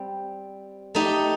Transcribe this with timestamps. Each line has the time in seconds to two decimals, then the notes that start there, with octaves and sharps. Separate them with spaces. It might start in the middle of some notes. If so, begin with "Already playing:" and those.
Already playing: G3 C4
0.95 A3 D#4 G4